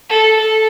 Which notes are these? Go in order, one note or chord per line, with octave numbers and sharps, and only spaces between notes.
A4
A4